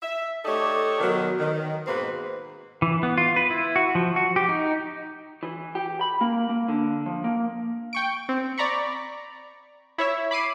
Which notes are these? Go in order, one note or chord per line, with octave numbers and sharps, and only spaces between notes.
E5
A3 D#4 G4 A4 C#5 D5
B2 D#3 F#3
D#3
G#2 B2 A#3 C4 B4
E3
B3
F4
B4
E4
F#4
F3
F#4
G4
D#4
E3
G4
B5
A#3
A#3
D3
F3
A#3
G5 C#6 D7
C4
D5 A#5 B5 C#6
E4 C#5 E5
B5 D6 C7 D#7